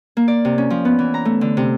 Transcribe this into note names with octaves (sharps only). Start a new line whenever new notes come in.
A#3
D5
C3
C#4
F3
B3
E3
A#5
A3
D3
C3